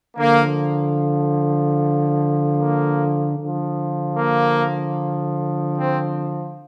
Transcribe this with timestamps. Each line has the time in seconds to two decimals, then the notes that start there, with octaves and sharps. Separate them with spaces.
0.17 D3 F3 A#3
2.57 A#3
3.37 D3 F3
4.17 A#3
5.77 C4